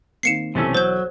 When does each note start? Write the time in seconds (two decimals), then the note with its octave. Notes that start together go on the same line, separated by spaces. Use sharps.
0.23 D#3 A#3 C4 C7 C#7 E7
0.55 B1 C3 E3 A3 C#4 E6
0.75 F#3 C5 G6